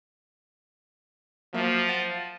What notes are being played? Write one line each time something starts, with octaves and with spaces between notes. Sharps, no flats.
F3 F#3 A#3 E5
F#5 A6 D#7